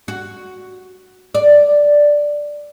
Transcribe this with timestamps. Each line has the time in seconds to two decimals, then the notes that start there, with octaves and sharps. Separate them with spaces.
0.08 F#4
1.35 D5